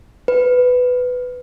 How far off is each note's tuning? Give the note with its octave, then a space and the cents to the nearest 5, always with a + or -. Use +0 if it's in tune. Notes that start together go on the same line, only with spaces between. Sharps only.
B4 +10